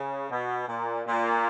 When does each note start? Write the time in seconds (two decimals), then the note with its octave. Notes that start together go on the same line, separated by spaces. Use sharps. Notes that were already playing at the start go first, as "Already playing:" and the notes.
Already playing: C#3
0.30 B2
0.68 A#2
1.06 A#2